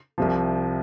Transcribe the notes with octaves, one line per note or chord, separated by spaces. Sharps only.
C2 C3 F3